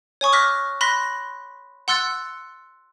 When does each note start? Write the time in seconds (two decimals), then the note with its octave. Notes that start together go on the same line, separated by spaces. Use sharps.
0.21 C#5 G#5 C#6 D#6
0.33 D6 F6 F#6 A#6 B6
0.81 B5 C6 F#6 A#6 B6
1.88 F#5 C6 E6 F#6 A6 C#7